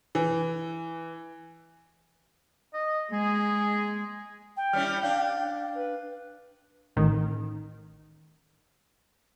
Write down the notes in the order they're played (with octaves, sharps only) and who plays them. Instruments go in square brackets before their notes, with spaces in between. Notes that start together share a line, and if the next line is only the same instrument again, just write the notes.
[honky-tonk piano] E3
[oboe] D#5
[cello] G#3 [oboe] G#4
[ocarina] G5
[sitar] G3 C#4 E4 [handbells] F6
[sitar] D4 [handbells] F5
[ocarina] B4
[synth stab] A1 D#3